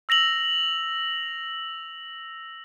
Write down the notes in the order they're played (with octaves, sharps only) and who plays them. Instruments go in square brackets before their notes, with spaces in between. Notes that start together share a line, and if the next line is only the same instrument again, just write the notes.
[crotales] E6 A#6 F7 F#7